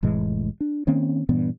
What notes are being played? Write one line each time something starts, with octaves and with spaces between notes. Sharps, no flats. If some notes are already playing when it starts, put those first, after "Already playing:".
F1 A2 E3 G#3
D4
D#3 A#3 C4 C#4
G2 A#2 E3 B3